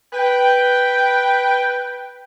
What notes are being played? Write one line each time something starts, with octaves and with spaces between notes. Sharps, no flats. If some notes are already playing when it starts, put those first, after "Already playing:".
B4 G5